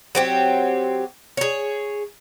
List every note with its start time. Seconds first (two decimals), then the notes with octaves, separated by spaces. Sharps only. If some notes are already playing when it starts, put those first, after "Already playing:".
0.15 F#3 C4 G4
1.37 G#4 C#5